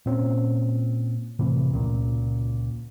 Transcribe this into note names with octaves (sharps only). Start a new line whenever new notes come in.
A#2 C4 C#4
F1 A2 C3 E3
C#2 A#2